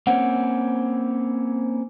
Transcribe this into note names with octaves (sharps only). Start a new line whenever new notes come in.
A#3 C4 C#4 F#5